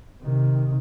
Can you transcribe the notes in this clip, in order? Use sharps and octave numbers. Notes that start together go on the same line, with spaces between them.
C3 D#3